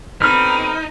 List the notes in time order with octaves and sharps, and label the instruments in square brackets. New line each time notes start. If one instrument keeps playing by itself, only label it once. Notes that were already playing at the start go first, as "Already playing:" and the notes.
[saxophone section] B2 D3 C4 [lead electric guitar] D#4 [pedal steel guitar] B5 F6